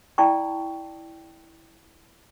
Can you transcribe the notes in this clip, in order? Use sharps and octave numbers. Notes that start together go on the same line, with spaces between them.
E4 D5 G5 A5 C#6